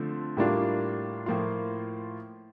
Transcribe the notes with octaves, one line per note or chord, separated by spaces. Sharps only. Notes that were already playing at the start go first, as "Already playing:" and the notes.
Already playing: D3 F3 A3 C4
A2 G3 A#3 D4 F4
A2 F3 A#3 F4